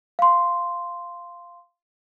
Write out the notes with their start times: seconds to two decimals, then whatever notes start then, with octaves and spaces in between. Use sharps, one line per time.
0.19 F5 C6